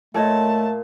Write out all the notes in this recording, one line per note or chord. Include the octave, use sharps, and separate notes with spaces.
A#2 A3 A4 C#5 D#5 A5 C6